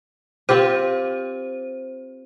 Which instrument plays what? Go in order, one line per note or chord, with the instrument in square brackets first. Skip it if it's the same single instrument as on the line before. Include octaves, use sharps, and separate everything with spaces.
[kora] C4 F4 G4 [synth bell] C5